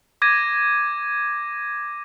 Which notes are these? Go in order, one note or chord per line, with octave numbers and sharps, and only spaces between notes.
D6 G#6 A#6 D#7